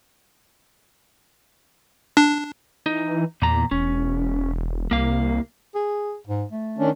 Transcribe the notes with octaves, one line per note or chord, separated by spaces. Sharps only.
D4
E3 D#4
E2 A#2 A#5
E1 C#4
C2 A#3 F5
G#4
G#2
A3
D#3 C#4 D4